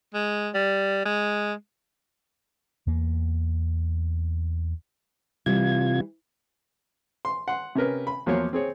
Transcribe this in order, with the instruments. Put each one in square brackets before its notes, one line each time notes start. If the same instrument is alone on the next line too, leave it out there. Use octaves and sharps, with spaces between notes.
[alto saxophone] G#3
G3
G#3
[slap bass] E2 A#3
[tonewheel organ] C3 F4 G#6 [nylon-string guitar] E3 G3
[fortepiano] C6
F#5 C6
C3 C#4 A#4 B4
B5
E2 F3 F#3 A#3 C#5 C6
C4 G#4 C#5